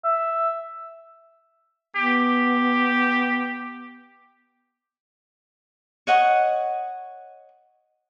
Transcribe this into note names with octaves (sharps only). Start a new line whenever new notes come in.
E5
B3 G4
C#5 D#5 F#5 C#6